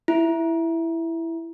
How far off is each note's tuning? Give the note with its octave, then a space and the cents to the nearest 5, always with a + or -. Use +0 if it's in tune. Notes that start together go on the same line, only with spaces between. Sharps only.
E4 +5